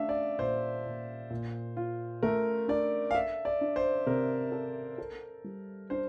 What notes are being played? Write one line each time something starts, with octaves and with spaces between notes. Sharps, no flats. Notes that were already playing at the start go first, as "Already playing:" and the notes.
Already playing: A3 D4 E5 F5
D5
A#2 C5
A#2
A#2
F4
A3 A#4
D4 D5
F5
A4 E5
D5
D4
C5
C3 A#4
A4
A4
G3
D4 C5